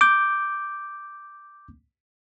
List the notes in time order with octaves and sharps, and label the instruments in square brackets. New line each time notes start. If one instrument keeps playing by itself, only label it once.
[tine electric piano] D6 G6